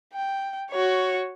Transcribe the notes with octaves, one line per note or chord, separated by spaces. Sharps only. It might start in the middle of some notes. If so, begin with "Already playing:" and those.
G5
F#4 C#5